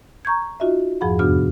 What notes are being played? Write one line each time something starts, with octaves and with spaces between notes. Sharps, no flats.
A#5 C#6 G6 G#6
D#4 F4 F#4 D#5 E5
F2 G#2 F3 G#4 F#5 B5
E2 C3 B3 D4 F#4 F6